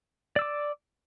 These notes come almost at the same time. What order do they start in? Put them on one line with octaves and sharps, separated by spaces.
D5 E6 D6